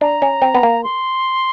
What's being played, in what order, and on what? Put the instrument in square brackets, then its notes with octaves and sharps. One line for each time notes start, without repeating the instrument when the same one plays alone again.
[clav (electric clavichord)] D4 [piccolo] A#5
[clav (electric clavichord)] C#4
C4
B3
A#3
[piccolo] C6